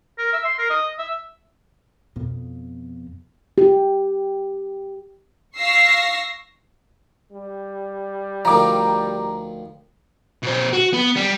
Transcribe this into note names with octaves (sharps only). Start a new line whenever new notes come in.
A#4
E5
C6
A#4
D#5
E5
F2 B2
G4
F5 C#6 E6 A#6 C7
G3
D2 D#3 F3 A#5 D6
B2 C5
F#4
B3
G3